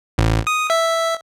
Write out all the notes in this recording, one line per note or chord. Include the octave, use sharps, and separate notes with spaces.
A1
D#6
E5